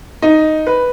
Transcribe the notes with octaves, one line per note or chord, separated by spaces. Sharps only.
D#4
B4